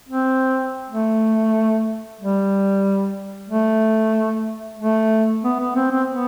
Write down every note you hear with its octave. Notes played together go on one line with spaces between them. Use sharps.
C4
A3
G3
A3
A3
B3
B3
C4
C4
B3